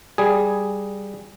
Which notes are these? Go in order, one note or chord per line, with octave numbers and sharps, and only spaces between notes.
G3 G#4